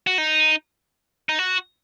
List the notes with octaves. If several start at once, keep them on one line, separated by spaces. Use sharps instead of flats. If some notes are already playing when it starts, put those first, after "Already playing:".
F#4
D#4
D#4
F#4